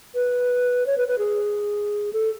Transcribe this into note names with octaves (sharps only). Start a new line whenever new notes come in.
B4
C#5
B4
B4
G#4
A4